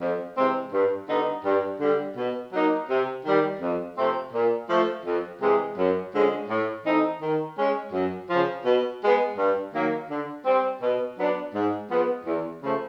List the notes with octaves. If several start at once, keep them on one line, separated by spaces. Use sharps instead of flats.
F2
C3 E3 G#3 C4
G2
D3 G3 B3 D#4
G2
D3 G3
B2
F#3 A#3 D#4
C3
D#3 G3
F2
C3 F3 A3 C4
A#2
F3 A3
F2
C3 E3 G#3
F#2
D3 F3 G#3 C#4
A2
E3 A3 C4 D#4
D#3
G#3 C#4
F#2
C#3 F3
B2
G#3 B3
G2
D#3 F#3 A#3
D3
G3 C4
B2
F#3 B3 D4
G#2
F3 G#3 B3
E2
C#3 F3 A3